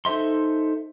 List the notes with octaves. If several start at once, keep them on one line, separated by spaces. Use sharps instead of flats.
D#4 A4 C5 E5 C6